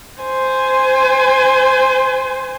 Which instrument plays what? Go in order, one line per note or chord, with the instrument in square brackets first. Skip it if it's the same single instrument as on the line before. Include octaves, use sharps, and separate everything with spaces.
[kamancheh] C5 G#5